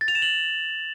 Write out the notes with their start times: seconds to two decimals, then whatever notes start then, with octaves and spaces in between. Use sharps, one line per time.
0.01 A6
0.08 F7
0.15 E7
0.22 F#7